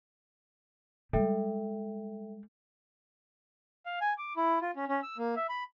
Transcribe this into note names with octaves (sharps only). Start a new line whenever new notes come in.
G3 G#3 A4 E5 G5
F5
G#5
D6
E4
F4
C#4
C#4
E6
A#3
E5
B5